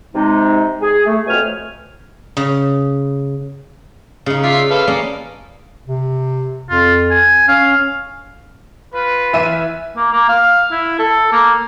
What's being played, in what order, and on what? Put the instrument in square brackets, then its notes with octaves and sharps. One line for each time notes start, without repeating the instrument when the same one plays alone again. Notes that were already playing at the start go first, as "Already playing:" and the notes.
[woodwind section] C3 G#3 D#4
G#4
A3
F2 B2 A3 C#5 G#5 F6
[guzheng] C#3
C#3 D#4
[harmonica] F4 E5 [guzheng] D5
[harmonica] A4 B4 F5
[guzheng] A#3 C#4 D#5 [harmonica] D5
[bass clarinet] C3
[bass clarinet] F2 [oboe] F4
[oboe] G#5
[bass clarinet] C#4 [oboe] F5
[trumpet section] F4 B4
[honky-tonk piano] E3 E5 D#7
[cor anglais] A#3
A#3
F5
E4
A4
A#3